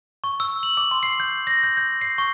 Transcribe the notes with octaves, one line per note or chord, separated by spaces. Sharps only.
C#6
E6
F#7
D6
C6
C7
G6
A#6
G6
G6
C7
C#6